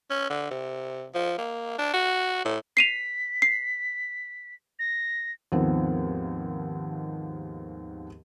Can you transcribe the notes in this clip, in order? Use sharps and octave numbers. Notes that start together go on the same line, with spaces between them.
C#4
D3
C3
F3
A#3
D4
F#4
A2
B6 C7 D#7 F7
C7
A#6
D#2 G#2 F3 B3 C4